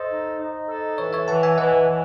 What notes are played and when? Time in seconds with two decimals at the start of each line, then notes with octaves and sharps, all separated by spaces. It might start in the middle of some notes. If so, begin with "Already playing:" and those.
Already playing: A4 C5 D#5
0.09 D#4
0.38 D#4
0.68 A4
0.98 E3 C#5
1.13 C#5 E5
1.28 E3 F#5 A5
1.43 E5 G#5
1.58 E3 D#5 F#5
1.87 E3